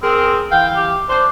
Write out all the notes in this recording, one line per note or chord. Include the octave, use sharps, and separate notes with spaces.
C4 G#4 A#4
E3 F5 G5
G4
D4 C5